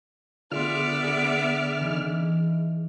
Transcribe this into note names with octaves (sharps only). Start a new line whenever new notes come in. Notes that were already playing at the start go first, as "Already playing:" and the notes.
D3 B3 F4 G#4 D5 E5 C6 F6
G#4
E3 D#4